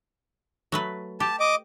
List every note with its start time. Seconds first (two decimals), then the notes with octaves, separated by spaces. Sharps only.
0.72 F#3 A3 B4
1.20 G4 A5
1.40 D#5 D6